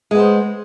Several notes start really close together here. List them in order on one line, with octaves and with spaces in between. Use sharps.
G#3 B3 C5